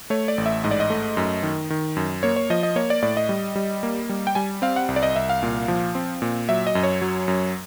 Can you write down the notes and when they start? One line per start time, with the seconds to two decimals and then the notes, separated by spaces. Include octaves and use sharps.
0.10 A3 C#5
0.28 D5
0.38 A1
0.46 E5
0.64 G#2 D#5
0.71 D5
0.80 D#5
0.90 A3
1.17 F#2
1.43 D#3
1.70 D#3
1.96 F#2
2.23 A#3 C#5
2.36 C#5
2.50 F3 D#5
2.63 D#5
2.76 A#3 C#5
2.90 D5
3.02 A2 D5
3.17 D#5
3.29 G3
3.56 G3
3.83 A#3
4.09 G3
4.27 G5
4.35 G3 G#5
4.62 C4 F5
4.76 F#5
4.88 C2
4.96 D5
5.03 D#5
5.16 C2 E5
5.29 F5
5.43 A#2
5.68 F3
5.95 C4
6.22 A#2
6.49 F#3 E5
6.67 D#5
6.75 F#2
6.83 C#5
7.02 F#3
7.28 F#2